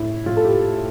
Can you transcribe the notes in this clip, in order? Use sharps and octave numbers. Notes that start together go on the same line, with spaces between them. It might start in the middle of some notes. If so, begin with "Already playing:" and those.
Already playing: A2 F3 E4
A2 F4
A4
G4